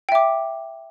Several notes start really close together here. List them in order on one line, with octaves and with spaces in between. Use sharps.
G5 E5 D6